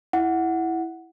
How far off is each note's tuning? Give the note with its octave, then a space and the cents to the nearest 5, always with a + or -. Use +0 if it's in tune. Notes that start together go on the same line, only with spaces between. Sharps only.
E4 +0 F#5 +0